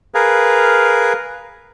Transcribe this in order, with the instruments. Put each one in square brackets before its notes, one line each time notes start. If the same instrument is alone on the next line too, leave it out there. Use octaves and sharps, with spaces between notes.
[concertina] G#4 A#4 B4 F5